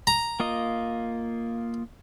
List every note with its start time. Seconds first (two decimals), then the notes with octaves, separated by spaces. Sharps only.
0.07 A#5
0.40 A#3 F4 D#5